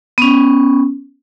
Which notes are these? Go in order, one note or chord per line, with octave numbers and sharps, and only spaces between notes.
B3 C#4